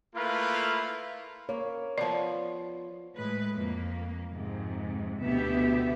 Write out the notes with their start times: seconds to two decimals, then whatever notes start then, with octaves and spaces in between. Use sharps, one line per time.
0.14 A3 A#3 E4 F4 B4 F5
1.49 A#3 C#5
1.98 F3 B3 D5
3.16 A2 G#3 B4
3.55 F2 A#3
4.29 F2 G#2 C3
5.20 D2 B2 B3 G4 E5